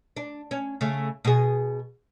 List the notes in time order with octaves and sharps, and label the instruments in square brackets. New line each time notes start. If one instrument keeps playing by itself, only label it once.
[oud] D4
C#4
C#3 A3
B2 G#4